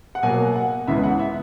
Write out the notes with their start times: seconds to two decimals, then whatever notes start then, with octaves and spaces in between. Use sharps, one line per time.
0.15 F#5
0.23 B2 F#3 A#3 G#5
0.56 F#5
0.87 C#2 C#3 E3 G#3 B3 E5
1.03 F#5
1.19 E5